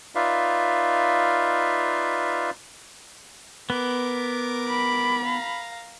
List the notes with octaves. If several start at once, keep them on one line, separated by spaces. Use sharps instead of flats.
D#4 F4 B4 D5 E5 F5
B3 A#4 D6
B5
F5 A#5